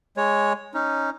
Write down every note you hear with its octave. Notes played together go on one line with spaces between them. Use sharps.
G#3 C#5
C#4 D#4